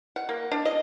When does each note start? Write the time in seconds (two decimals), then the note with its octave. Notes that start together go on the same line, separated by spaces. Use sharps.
0.16 F#5
0.29 A#3
0.52 D4
0.65 D#5